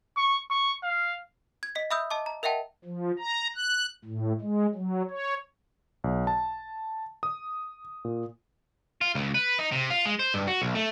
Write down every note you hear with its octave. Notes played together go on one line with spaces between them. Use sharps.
C#6
C#6
F5
G#6
D#5 B6
E5 B5 D#6 E6 G6
D#5 A5 D6
A#5
A#4 D#5 E5 F#5 G5 A5
F3
A#5
F#6
A2
G#3
F#3
C#5
B1
A5
D#6
A#2
F4
C#2
B4
D#4
C3
F4
G#3
C5
G2
F#4
B1
A3